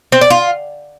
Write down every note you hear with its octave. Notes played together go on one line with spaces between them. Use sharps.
C4
D5
F4